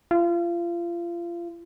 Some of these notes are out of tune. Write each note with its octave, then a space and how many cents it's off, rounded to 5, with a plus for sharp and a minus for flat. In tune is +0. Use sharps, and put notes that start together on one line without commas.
F4 -30